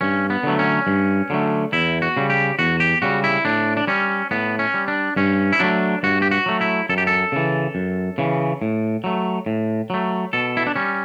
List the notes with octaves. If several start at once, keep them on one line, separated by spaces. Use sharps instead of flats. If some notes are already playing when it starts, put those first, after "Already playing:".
G2 C#4
B3
D3 F#3 A3
C#4
G2
D3 F#3 A3
E2 E4
F#4
C#3 G3
G4
E2 F#4
G4
C#3 G3 F#4
E4
A2 D4
D4
G3 C#4
A2 B3
C#4
G3
D4
G2 C#4
E4
F#3 A3 D4
G2 F#4
G4
F#4
F#3 A3
E4
F#2 A4
G4
A4
C#3 E3
F#2
C#3 E3
A2
F#3 A3
A2
F#3 A3
B2 A4
E4
D4
G3 C#4